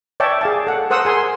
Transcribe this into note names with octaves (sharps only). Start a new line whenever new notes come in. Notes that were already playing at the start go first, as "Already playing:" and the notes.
C#5 D5 E5 G5 A5
G#4 F5 A5
A4 F#5
A#4 C5 F#5 D#6 E6
G#4 G#5 C6